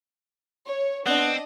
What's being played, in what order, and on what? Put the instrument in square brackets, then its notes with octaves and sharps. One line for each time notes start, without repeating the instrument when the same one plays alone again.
[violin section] C#5
[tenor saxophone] B3 [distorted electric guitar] C4 [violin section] D4 D#5